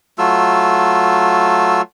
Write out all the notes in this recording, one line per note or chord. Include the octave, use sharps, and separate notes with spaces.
F#3 A3 F4 E6